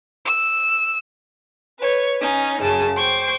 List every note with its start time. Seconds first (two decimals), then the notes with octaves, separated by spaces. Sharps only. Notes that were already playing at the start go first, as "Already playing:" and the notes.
0.24 E6
1.79 B4 C#5
2.20 C#4 D#4
2.60 F#2 C#3 A5
2.96 C5 G5 C#6 D6